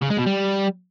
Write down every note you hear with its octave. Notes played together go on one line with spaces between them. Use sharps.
C#3
G#3
B2
G3